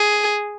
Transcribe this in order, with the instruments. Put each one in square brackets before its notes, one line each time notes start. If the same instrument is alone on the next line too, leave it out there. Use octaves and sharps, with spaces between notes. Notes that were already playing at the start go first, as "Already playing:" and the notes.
Already playing: [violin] G#4